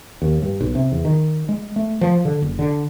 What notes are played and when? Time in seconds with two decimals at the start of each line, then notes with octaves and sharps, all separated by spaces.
0.22 D#2
0.42 G2
0.61 B1
0.75 C3
0.92 E2
1.05 D#3
1.49 G#3
1.76 A3
2.01 F3
2.25 D3
2.42 F#1
2.59 D3